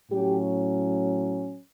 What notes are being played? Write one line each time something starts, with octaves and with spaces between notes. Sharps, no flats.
A2 F#3 C#4 G4